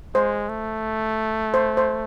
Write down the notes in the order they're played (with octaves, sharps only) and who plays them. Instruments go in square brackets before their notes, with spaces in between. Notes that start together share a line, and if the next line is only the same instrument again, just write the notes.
[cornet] G#3 [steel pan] C5
[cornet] A3
[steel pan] C5
C5